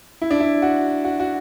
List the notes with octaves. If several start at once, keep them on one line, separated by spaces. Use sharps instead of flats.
E4
D4
E4
F#4
F#4
F#4